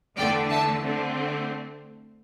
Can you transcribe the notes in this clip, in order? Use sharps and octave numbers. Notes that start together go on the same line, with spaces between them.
E2 D3 A3 D5 G5
E5 A5
D3 A3 C4